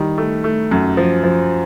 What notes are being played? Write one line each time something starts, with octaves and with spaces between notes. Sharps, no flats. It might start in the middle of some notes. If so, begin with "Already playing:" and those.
Already playing: D#3 G3
A3
A3
F#2
F3
F3